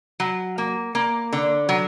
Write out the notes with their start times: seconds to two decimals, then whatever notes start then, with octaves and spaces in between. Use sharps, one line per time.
0.20 F#3
0.58 A#3
0.95 A#3
1.33 D3
1.69 F#3